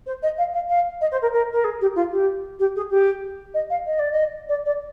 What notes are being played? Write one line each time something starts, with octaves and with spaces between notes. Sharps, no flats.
C5
D#5
F5
F5
F5
D#5
C5
A#4
A#4
A#4
G#4
G4
F4
G4
G4
G#4
G4
D#5
F5
D#5
D5
D#5
D5
D5